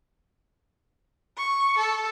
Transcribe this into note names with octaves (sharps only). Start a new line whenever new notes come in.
C#6
A4